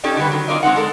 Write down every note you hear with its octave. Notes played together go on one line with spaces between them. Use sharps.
C#4 D#4 G4 A4 D5 D#5
D3 G3 B4
D#3 F#3
C4 D#4 F4 A#4 D5 D#5
G#3 C4 D#4 F#5
G#3 A4 A#4